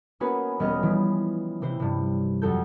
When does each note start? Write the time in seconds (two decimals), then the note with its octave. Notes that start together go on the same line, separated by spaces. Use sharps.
0.20 A#3 B3 C#4 F#4 G#4 B4
0.60 E1 G3 B3 C#4 D#5 F6
0.83 E3 F3
1.62 C3 E3 C5
1.80 G2 C3
2.42 F2 F#3 F#4 A4 G6